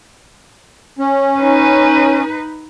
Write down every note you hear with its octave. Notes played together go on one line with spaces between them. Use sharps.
C#4
D#4 B4